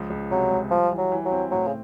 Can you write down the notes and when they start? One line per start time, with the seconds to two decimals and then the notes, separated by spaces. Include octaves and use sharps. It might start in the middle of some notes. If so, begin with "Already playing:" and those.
Already playing: C#2 F3
0.10 C#2
0.31 C3 F#3
0.51 C#2
0.71 F3 G3
0.92 E3
0.98 F#3
1.12 E3
1.25 F#3
1.31 C4
1.51 A2 F#3
1.67 C#3